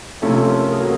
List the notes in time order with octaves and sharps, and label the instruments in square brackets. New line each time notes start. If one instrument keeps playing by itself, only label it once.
[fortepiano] C3 F3 A3 C#4 E4 [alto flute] A4
[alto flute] A#4
G#4
[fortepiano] F#3 A#3 [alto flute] A4